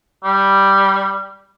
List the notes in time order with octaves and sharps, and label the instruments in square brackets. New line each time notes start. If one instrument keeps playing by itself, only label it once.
[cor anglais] G3